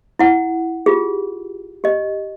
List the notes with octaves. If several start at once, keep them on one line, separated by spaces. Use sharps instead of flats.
E4 F#5
F4 G4 G#4
G4 D#5